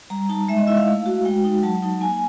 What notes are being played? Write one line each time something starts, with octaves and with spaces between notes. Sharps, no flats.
G3 A#5
D#4 A5
G#3 E5
D#5
E4 E5
F5
A3
F#4
G#3 G5
D#4
F#3 A5
D#4
A#3 G#5